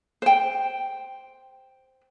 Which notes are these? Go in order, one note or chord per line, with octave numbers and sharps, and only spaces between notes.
C5 G5